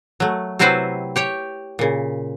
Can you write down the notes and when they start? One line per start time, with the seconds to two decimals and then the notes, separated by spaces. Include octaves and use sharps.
0.20 F#3 A3
0.59 C3 F#3 C4 E4 B4 C5
1.16 G4 C#5 G5
1.79 A#2 C#3